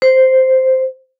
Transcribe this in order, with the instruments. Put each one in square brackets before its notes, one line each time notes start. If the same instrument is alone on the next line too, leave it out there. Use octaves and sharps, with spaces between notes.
[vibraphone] C5